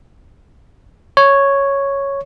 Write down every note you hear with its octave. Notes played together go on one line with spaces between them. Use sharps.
C#5